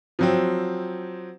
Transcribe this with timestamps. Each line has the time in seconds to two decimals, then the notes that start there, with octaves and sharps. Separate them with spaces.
0.19 F3 F#3 C4